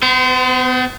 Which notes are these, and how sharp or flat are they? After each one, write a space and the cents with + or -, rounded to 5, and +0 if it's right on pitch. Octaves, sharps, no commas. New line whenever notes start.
B3 +35 C5 -30